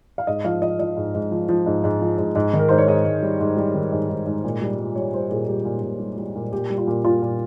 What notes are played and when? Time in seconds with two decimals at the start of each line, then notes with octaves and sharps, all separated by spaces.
0.18 F5
0.27 G#2 D#5
0.44 F3 F5
0.62 F3 D#5
0.79 F3 D#5
0.97 G#2
1.14 G#2
1.31 F3
1.49 F3
1.66 G#2
1.84 G#2
2.01 F3
2.18 G#2
2.35 G#2
2.53 D#3
2.59 A#4
2.69 G#2 C5
2.78 C#5
2.87 G#2 D#5
3.05 G#2
3.23 G3
3.40 G#2
3.57 G3
3.75 D#3
3.92 G#2
4.09 G#2
4.26 G#2
4.44 A#2
4.62 G3
4.79 G3
4.95 G3 C#5
5.13 G3 C5
5.30 A#2 G#4
5.48 G3 G4
5.65 A#2
5.83 A#2
6.00 G3
6.18 G3
6.36 A#2
6.52 A#2 G4
6.70 G3
6.78 F4
6.87 A#2
7.05 A#2 F4
7.22 A#2